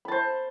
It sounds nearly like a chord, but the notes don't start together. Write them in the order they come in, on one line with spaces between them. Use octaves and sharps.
B5 A5 C5